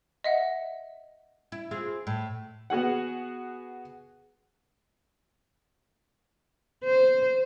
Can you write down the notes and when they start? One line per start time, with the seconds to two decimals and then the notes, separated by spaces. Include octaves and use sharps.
0.24 D#5 E5 F#5
1.52 E4
1.71 C4 F4 G#4
2.07 A2
2.70 B3 F#4 G#4 F#5
6.84 C5